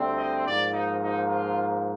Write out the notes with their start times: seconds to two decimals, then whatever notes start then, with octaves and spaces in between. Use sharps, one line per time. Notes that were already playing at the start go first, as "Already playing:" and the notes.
Already playing: D2 D3 G3 C4
0.17 D#5
0.45 G#2 F3 A#3 D5
0.73 D#4
1.01 D#4
1.29 F4